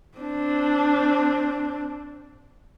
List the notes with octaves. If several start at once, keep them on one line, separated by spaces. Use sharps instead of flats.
C4 D4